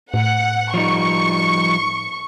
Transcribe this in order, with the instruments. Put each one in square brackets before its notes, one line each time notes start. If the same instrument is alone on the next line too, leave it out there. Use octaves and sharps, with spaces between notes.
[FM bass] A2 [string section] F#5
[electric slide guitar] F3 G3 D#4 [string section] C#6